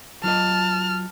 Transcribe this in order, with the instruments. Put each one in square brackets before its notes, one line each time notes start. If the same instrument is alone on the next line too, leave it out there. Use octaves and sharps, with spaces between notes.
[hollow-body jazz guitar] F#3 F4 D#5 [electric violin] A5 F6